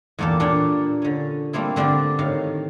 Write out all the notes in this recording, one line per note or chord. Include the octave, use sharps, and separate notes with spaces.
E2 A#2 A#3 G4 A4
A#2 D4 C#5 G5
D3 C#4
G3 A3 A#3 C4 E4
D3 C4 D4 F4 G4
A2 D#3 F5